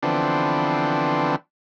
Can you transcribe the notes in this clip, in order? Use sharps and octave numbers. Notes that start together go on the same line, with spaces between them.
D3 E3 F3 B3 C4 D4